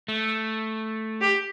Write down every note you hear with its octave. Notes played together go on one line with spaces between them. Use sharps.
A3
G4